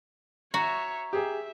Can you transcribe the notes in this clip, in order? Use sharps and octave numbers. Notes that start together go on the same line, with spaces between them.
F#4 C#5 E5 A#5
G4 G#4 E5